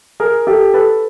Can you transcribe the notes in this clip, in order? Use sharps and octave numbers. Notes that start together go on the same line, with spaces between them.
G#4 A#4
G4 A4
A4 B4